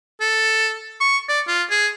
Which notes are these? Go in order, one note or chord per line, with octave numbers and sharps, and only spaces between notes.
A4
C#6
D5
F4
G#4